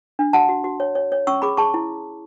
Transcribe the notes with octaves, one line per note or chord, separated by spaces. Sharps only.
D4
F#4 F#5 A5
F#4
F#4
C#5
C#5
C#5
C#4 C#6 E6
G#4 B5 D6
G#4 A5 C#6
E4